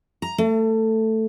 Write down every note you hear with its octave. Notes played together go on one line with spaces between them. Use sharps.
A#5
A3